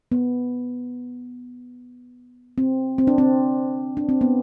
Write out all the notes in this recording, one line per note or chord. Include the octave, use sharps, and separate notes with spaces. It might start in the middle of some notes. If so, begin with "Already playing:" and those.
B3
C4
C4
D4
C4
D4
C4
B3